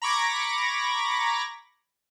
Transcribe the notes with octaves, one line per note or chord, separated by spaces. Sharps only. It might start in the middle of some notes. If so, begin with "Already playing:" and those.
A#5 B5 C#6 D6 G#6 A#6